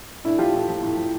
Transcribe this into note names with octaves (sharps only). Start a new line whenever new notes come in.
A2 D4 E4
F3 F4 G4
A2
F3
A2
F3